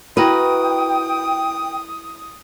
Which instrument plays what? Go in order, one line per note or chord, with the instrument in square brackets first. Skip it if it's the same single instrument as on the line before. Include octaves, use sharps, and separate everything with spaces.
[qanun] E4 F#4 A#4 [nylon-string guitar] B4 [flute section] G5 [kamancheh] D#6